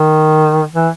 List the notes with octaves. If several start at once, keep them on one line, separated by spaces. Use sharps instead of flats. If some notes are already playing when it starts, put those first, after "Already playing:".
Already playing: D#3
E3